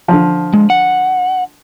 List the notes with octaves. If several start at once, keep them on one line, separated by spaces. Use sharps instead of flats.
D3 F3
G#3
F#5